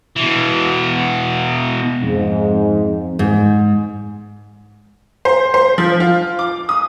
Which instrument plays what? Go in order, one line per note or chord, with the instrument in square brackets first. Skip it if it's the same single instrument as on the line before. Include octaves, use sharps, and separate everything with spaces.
[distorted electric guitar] B2 E3
[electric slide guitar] F2 [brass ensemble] G#2
[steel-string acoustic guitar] G#2
[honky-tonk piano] C5
C5
F3
F4
D6
D#6